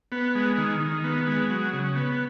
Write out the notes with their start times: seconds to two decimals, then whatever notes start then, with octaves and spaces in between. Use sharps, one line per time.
0.12 B3
0.35 G#3
0.58 D#3
0.80 D#3
1.04 B3
1.27 G#3
1.50 F#3
1.73 C#3
1.96 B3